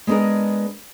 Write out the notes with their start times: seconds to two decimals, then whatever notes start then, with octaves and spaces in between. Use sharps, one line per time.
0.07 G#3 B3 D4 G#4 A#4